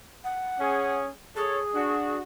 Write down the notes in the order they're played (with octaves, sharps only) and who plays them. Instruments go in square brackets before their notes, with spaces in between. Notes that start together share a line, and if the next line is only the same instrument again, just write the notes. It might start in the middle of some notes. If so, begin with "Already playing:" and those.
[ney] F#5
[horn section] C#4 G#4
[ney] G#4 [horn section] A4 C#5
[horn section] D4 F#4